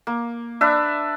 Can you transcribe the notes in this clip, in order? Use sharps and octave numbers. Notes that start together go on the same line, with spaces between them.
A#3
D4 B4 E5